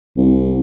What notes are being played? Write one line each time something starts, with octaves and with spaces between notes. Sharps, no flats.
C2